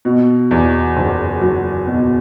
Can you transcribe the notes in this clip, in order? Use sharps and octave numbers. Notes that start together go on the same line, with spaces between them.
B2
E2
F#1
F#3
B2